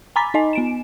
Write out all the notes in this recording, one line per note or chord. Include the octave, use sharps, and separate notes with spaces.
G#5 A#5 B5 D6 A6 B6
D#4 D#5 G#5
B3 D7 E7